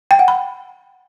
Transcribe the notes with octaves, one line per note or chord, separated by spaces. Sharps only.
G5
F#5
B5